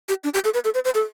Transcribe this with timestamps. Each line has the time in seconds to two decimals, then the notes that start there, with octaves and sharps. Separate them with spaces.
0.09 G4
0.24 D4
0.34 G4
0.44 A4
0.54 B4
0.64 A4
0.74 C5
0.85 C5
0.94 A4